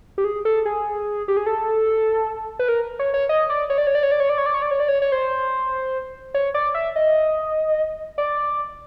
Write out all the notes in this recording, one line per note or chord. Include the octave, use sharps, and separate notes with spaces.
G4
G#4
A4
G#4
G4
G#4
A4
B4
A#4
C#5
C#5
D#5
D5
C#5
D5
C#5
D5
C#5
D5
C#5
D5
C#5
D5
C#5
D5
C#5
D5
C#5
C#5
C5
C#5
D5
E5
D#5
D5